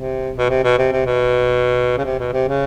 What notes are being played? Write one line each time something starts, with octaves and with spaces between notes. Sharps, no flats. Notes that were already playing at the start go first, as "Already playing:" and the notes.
Already playing: C3
B2
C3
B2
C3
C3
B2
C#3
C3
B2
C3
C#3